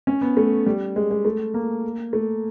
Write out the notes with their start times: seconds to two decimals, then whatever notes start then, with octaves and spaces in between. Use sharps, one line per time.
0.07 C#4
0.21 B3
0.37 A3
0.66 G3
0.96 G#3
1.11 G#3
1.25 A3
1.54 A#3
2.13 A3